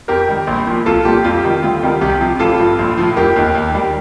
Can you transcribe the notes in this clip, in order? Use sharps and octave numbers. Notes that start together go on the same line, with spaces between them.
F2 G4 A#4
D#3 G3
A#1
A#2 F3
C2 F4 A4
A#2 G3 G4
F2 F4
G4
C3 D#3 G3
D2 F4
C3 D#3 G3
C2 G4
C3 F3
A1 F4 A4
G2 F3
A#1
A2 F3
F1 G4 A#4
D#2 D#3
D#2
D#3 G3